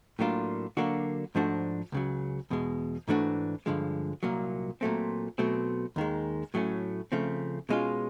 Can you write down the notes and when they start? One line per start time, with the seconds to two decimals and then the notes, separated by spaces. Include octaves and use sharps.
0.19 A2 F#3 A#3 D4 F4
0.77 D3 F#3 A#3 D4 F#4
1.35 G#2 F3 A3 D4 F#4
1.92 C#2 C#3 F#3
2.50 E2 B2 G#3
3.08 G#2 E3 A3 D4 F#4
3.66 G2 D3 F3 G#3
4.23 C2 A#2 F#3 A#3
4.81 A#2 F#3 A3 C4
5.38 B2 F#3 A3 C4
5.96 D#2 D#3 G#3
6.54 A2 F#3 A3 C#4
7.12 C#3 F3 A3 C4
7.69 B2 G#3 C#4 F4